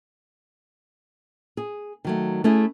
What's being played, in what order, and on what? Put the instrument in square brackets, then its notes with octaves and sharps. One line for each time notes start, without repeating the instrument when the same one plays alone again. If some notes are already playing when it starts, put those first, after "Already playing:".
[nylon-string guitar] G#4
D#3 F#3 A3
A3 C#4 E4 G#4